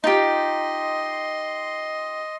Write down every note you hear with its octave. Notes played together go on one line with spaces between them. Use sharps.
D#4 F4 G4 D#5 C6